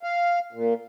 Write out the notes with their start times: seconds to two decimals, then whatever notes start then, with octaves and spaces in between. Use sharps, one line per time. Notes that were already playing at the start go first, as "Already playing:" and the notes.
0.03 F5
0.53 A#2